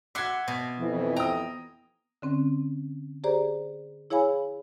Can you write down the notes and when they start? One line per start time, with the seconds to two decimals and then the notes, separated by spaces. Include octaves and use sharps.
0.15 E5 F#5 C6 D6 G#6
0.48 B2
0.78 F2 E3
1.16 G5 A#5 D#6
2.22 D3 C4 C#4
3.24 G4 G#4 C5 D5 A#5
4.10 E4 G#4 C#5 F5 G#5 B5